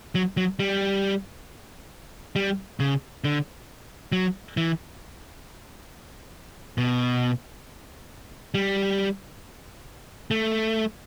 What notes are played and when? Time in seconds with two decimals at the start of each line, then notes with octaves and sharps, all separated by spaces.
0.15 F#3
0.37 F#3
0.59 G3
2.36 G3
2.80 C#3
3.24 D3
4.12 F#3
4.57 E3
6.78 B2
8.54 G3
10.31 A3